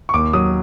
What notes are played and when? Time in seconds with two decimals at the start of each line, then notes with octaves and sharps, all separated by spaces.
0.09 C#6
0.14 D#2 D6
0.33 F#3 D#6